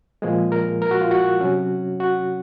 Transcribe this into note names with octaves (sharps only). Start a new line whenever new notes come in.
A#2 F3 G#3 G#4
A#4
A#4
F#4
F4
F#4
C3 F#3 C#4
F#4